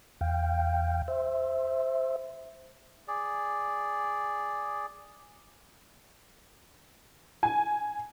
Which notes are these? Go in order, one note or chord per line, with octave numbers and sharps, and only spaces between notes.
E2 F5 G5
C5 E5
G#4 D5
G#5